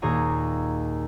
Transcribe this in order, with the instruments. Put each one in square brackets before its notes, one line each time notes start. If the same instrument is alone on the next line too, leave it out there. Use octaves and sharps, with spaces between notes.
[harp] D#2 A#2 G#4 A#5 C#6